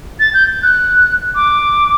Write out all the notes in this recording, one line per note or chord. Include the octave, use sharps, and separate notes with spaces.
A6
G6
F#6
D6